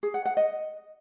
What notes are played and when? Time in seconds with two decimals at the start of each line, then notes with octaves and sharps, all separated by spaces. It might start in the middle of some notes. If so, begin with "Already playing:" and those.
0.03 G#4
0.14 F#5
0.25 F#5
0.37 D#5